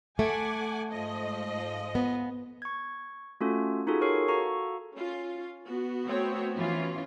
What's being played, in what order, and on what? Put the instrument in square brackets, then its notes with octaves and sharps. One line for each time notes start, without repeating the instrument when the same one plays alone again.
[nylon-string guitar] A3 [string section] F#5 G#5 D6
[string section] G#2 F3 D#5
[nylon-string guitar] B3
[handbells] C#6 G#6
A3 C#4 F4 F#4 A4
D#4 F4 F#4 G#4 A4
G#4 A#4 C#5 C#6 C7
F#4 A4 F5 A#5 C#6
[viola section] C#4 F4
B3 F#4
[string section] A3 C4 C#5
E3 C#4 F4